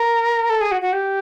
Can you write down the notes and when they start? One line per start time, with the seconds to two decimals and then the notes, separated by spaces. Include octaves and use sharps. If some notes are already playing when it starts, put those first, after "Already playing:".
Already playing: A#4
0.50 A4
0.61 G#4
0.71 F#4
0.81 F#4
0.93 G4